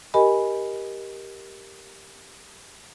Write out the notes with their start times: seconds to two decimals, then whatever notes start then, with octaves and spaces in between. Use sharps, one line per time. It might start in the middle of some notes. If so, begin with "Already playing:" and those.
0.14 G4 A#4 D#5 G#5 B5